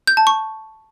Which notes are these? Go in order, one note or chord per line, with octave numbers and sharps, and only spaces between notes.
G6
A5
C#6